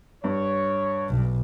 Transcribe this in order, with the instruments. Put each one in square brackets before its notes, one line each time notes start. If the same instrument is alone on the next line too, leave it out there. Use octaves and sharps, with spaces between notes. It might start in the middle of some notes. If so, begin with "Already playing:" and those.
[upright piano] G2 [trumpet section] C#5
[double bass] B1